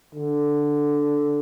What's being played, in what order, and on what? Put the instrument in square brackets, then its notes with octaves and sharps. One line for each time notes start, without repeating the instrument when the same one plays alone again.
[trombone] D3